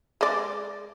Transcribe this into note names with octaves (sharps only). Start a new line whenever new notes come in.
G#3 D5